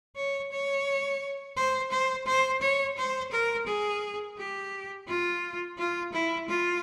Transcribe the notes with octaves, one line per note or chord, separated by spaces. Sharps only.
C#5
C#5
C5
C5
C5
C#5
C5
A#4
G#4
G4
F4
F4
E4
F4